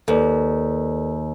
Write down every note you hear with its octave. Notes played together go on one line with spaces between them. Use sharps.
D#2 A4 B4 D5